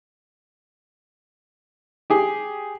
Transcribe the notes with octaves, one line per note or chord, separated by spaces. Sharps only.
G4 G#4